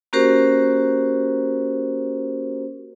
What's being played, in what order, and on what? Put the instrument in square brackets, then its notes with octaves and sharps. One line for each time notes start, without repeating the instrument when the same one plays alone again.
[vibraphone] A#3 C#4 F#4 G4 A#4 C5